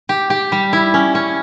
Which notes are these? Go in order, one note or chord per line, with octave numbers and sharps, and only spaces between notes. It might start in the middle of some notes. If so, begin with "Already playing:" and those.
G4
G4
G3
E4
C#4
C#4